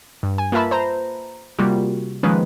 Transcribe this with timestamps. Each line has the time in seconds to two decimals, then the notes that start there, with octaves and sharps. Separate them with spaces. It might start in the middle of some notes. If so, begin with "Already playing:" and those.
0.23 G2
0.38 G#5
0.52 A#3 F4 B4 E5 A5 B5
0.71 C5 A#5
1.59 C3 G3 A#3 F4 F#4
2.23 D#3 F3 G#3 A#3 C#4 B4